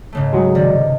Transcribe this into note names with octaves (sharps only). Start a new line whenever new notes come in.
G#2 C#3 A3
F#3 G#3 G#4
C3 D#3 D5